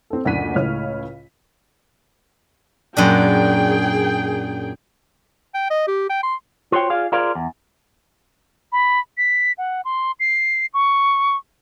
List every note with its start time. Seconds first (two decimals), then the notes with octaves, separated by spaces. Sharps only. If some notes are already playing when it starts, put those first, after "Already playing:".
0.10 C4 A4
0.25 F#1 D2 A#2 D4 B6 D#7
0.55 C#2 A2 C#3 C#5 F6
2.97 F#2 A#2 D4 G#4 G5
5.54 G5
5.70 D#5
5.87 G4
6.10 G5
6.23 C6
6.72 F4 F#4 C5 C#5 G5
6.90 F4 G#4 D5 F5
7.12 F4 G#4 A#4 C5 D5 F5
7.35 E2
8.72 B5
9.18 B6
9.58 F#5
9.85 C6
10.20 C7
10.74 C#6